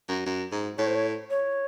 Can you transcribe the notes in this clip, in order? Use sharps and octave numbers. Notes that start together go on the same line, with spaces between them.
F#2
F#2
G#2
A2 C#5
C5
C#5
C#5